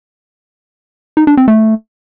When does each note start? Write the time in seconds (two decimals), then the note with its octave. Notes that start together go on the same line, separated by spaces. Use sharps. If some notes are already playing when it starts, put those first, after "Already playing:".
1.17 D#4
1.27 D4
1.37 C4
1.48 A3